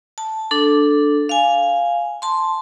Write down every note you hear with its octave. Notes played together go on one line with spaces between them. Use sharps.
A5
D4 A4
F5 G#5
A5 C6